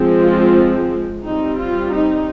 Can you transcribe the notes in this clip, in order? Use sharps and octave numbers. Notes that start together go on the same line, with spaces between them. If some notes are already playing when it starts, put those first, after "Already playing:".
Already playing: F3 G#3 C4
F4
G3 C4 D#4
F4
D#4